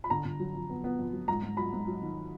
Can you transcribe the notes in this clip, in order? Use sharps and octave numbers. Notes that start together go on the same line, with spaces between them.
B5
D3 A#5
D3
F#3
F2
B3
B3
F2
F#3
G#2 A#5
G#2
F#3 B5
G#2
F#3
D#3